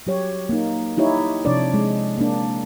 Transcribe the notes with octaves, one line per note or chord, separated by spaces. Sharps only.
F#3 G4 C#5
A#3 D#4
D#4 E4 G4 C#5
C3 F3 D4 C#5 D5
G#3
A#3 D4